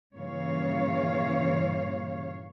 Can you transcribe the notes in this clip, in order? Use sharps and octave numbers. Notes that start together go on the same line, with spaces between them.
G2 A#2 C#3 E3 C#5 F5